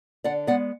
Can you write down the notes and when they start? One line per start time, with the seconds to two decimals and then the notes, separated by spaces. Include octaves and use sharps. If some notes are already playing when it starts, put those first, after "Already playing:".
0.24 D3 D5 F#5
0.47 G#3 B3 D5 F#5